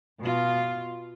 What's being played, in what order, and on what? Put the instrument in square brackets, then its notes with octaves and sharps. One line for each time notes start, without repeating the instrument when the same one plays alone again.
[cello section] B2 F4